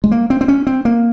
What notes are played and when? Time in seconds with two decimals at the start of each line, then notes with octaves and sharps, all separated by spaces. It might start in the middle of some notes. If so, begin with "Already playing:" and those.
0.04 G#3
0.12 A#3
0.30 C4
0.41 C4
0.48 C#4
0.67 C4
0.85 A#3